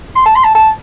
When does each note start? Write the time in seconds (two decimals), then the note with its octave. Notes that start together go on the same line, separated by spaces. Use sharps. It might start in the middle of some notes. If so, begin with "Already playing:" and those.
0.16 C6
0.26 A5
0.36 C6
0.44 A5
0.55 A5